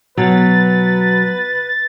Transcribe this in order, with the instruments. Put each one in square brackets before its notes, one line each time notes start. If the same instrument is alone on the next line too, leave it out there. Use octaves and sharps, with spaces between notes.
[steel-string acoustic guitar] B2 [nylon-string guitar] F#3 [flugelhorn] B4 [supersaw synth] A6